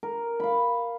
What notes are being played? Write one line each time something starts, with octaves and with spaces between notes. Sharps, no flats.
A#4
F5 B5